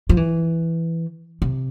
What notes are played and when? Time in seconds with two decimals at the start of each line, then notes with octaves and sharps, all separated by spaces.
0.09 F3
0.17 E3
1.42 C3